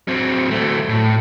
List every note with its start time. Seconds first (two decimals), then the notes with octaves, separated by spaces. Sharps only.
0.08 F#3 C4
0.51 F#3 A3
0.89 A2